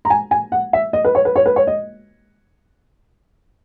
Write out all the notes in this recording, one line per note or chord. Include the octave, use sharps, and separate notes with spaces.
A#5
G#5
G#5
F#5
E5
D#5
B4
C#5
B4
C#5
B4
C#5
D#5